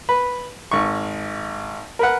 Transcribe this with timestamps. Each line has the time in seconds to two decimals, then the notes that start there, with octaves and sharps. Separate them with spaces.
0.09 B4
0.71 G#1 C#6
1.99 A#4 B4 F#5